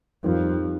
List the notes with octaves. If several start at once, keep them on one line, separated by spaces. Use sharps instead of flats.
F2 D#3 G3 C4 F4 A#4